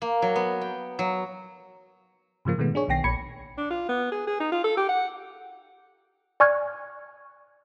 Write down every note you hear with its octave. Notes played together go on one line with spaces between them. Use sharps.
A#3
F#3
B3
G5
F#3
G#2 C#3 F3 A#3
B2 D#3 G#3 A3 B3
D4 G#4 C#5
B1 D#3 B3 G5 A#6 C7
A#1 A#2 B5 G#6 C#7
D4
F4
B3
G#4
G#4
D#4
F4
A4
G4
F#5
D5 G#5 C#6 F6 F#6 G#6